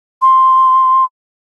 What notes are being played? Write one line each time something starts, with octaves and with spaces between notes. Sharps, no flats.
C6